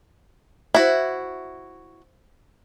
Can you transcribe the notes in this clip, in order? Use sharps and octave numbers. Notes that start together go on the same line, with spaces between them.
E4 F#4 C5 E5 F#5